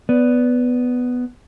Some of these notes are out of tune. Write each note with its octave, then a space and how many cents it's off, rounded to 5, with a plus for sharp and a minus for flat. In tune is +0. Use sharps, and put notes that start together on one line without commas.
B3 +5 D5 -15